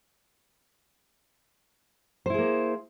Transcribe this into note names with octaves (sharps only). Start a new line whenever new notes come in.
A#3 E4 G#4 C5